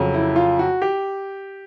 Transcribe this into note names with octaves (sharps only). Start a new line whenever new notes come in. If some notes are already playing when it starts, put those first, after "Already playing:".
Already playing: F2 C#3 F#3
E4
F4
F#4
G4